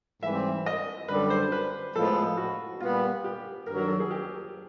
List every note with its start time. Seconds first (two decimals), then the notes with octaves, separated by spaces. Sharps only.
0.23 G#2 E3 G3 C4 E5
0.66 D#5
1.08 F#2 D3 G3 B4
1.30 C5
1.52 B4
1.95 A2 F3 G#3 B3 A4
2.37 F#4
2.80 A#2 G3 B3 F4
3.24 G4
3.67 G2 D#3 F#3 A#4
3.78 A#4
3.88 A4
4.00 G#4
4.11 G4